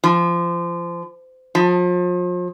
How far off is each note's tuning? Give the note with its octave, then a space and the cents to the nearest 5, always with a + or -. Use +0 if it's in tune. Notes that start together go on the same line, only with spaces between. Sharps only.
F3 -25
F3 +35